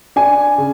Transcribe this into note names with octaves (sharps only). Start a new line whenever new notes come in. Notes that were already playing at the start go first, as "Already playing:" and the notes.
D4 G#5
C#3